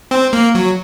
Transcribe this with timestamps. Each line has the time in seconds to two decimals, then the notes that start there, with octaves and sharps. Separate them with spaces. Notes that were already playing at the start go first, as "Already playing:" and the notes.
0.11 C4
0.33 A#3
0.55 F#3